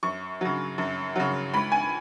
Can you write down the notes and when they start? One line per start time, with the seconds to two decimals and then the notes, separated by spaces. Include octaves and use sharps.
0.03 F#2 C#6
0.41 C#3 F#3
0.78 F#2
1.16 C#3 F#3
1.54 C#2 B5
1.72 G#5